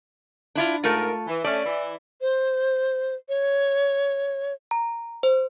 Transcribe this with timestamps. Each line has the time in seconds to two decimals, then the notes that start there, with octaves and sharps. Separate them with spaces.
0.55 D4 E4 F4
0.84 G#2 A3 F4 A#4
1.27 E3
1.44 A3 C#4 D5
1.66 E3 E4
2.21 C5
3.29 C#5
4.71 A#5
5.23 C5